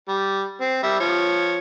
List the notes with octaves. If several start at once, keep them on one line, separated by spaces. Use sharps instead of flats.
G3
C4
G3 E5
F3 C#5